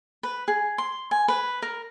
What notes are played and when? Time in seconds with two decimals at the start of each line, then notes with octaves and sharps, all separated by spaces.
0.23 B4
0.48 G#4
0.78 C6
1.11 G#5
1.28 B4
1.62 A#4